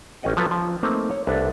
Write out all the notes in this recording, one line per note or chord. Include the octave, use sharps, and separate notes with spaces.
A1 C#4 G4 D#5 F#5 G5
F3 F#3 B3 A4 B4
F3
A3 A#3 C4 D#4 B4
C#5
C2 D4 A4 B4